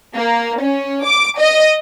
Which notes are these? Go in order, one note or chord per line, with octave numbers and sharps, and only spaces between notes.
A#3
C#4
D6
D#5